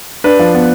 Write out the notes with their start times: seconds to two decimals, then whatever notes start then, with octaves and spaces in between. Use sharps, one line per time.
0.24 D4 B4
0.39 F3
0.54 B3